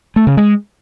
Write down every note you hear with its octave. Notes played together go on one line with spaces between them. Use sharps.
A3
C#3
G#3